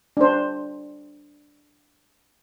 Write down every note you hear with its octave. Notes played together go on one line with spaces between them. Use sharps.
D4 C5